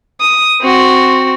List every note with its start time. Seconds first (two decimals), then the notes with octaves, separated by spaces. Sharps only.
0.21 D#6
0.61 C4 F#4